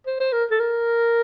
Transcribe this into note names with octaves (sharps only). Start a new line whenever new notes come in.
C5
C5
A#4
A4
A#4